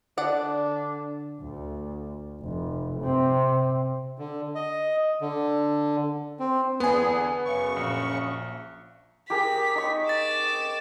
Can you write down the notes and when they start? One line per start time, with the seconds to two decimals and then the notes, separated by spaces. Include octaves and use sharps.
0.18 D3 D4 D5 F#5
1.41 D2
2.41 F1
3.01 C3 C4
4.18 D3
4.55 D#5
5.21 D3
6.39 C4
6.80 E2 D3 B3 G#4 G#5
7.45 F#2 C#3 C#6
7.77 A#1
9.30 G4 G#4 A#4 B6
9.75 D#4 C#6
10.09 D6 A6 E7